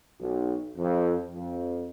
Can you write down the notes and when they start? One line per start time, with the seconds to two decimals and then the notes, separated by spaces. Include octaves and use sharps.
0.19 B1
0.76 F2
1.30 F2